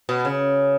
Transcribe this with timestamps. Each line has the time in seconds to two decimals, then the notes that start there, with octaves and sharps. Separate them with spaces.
0.09 B2
0.25 C#3